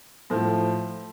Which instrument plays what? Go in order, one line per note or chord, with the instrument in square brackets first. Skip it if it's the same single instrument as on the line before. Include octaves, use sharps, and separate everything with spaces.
[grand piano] A2 F3